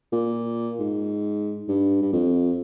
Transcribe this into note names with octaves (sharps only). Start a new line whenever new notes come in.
A#2
G#2
G2
G2
F2